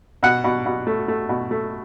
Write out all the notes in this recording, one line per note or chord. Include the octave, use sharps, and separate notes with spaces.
B2 F#5
B2
B2
A3
A3
B2
A3